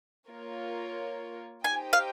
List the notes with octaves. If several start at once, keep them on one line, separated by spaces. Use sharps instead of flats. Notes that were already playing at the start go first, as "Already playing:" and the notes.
A#3 F4 A#4 C#5
D#4 G4 C5 D#5 G5 G#5
F5